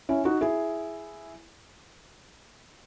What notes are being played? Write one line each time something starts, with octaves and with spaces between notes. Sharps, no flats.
C#4 E4
D#4 F#4
E4 G#4